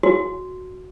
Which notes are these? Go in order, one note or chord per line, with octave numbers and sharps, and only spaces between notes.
F#4